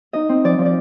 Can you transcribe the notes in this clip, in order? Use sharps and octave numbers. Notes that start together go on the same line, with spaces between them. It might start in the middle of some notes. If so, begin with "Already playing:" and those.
D#4 D#5
C4
F3 D5
F3
D5